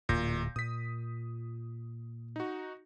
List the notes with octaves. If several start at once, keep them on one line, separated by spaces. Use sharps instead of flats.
D1 A#2 G6 A#6
A#2 D#6 B6
D#4 F#4